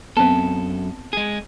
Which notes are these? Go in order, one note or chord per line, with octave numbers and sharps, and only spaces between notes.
F#2 B3 C4 A4 F5 G5 A5
G#3 G#4